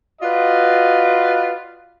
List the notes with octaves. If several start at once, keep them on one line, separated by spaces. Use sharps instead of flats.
F4 F#4 B4 D5 D#5